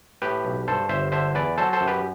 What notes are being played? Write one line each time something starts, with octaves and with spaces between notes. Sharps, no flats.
A2 G4 B4
B1
G2 A4 C5
G1 C5 E5
D3 C5 E5
E2 B4 D5
F#3 A4 C5
A4 C5
F#2
G4 B4